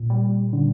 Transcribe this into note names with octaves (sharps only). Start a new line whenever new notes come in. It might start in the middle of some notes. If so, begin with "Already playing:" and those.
Already playing: A#2
G3
D3